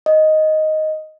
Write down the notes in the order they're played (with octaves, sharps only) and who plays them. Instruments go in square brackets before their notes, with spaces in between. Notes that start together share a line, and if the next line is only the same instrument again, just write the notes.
[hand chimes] D#5